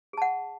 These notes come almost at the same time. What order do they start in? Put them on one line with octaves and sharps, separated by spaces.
G#4 A5 F#5